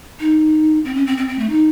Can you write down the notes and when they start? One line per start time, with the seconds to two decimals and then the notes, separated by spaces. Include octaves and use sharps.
0.20 D#4
0.85 C4
0.95 C#4
1.06 C4
1.17 C4
1.28 C4
1.39 A3
1.49 D#4